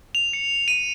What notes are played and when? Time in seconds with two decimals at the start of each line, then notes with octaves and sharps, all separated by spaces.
0.15 F7
0.33 C#7
0.68 D#7